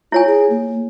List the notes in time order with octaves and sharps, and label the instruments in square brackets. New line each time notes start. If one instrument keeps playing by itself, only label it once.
[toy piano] E4 C#5 G#5 [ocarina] F4
[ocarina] G#4
A#3